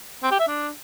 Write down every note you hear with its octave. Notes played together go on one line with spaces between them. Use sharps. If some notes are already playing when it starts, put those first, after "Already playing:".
C4
G4
E5
D4